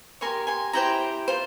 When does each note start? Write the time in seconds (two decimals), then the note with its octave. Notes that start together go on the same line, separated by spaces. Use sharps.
0.21 G4 A#4 C#5 G#5 C6
0.47 G#5 C6
0.73 E4 G4 C5 G5 A#5
1.28 F4 C5